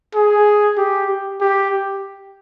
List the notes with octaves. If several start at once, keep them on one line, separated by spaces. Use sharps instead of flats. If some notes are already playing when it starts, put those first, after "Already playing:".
G#4
G4
G4